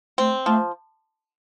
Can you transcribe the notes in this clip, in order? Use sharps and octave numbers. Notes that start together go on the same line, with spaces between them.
A3 C4
F3 A3